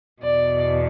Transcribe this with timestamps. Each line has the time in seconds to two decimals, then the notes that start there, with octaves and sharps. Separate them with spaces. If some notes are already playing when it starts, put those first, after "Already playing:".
0.22 E2 B2 D5